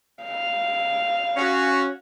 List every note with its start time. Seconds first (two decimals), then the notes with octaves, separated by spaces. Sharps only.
0.24 F5
1.37 C#4 F#4